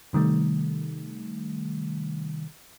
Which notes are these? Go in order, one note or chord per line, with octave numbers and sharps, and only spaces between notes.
C3 D#3 G3 A3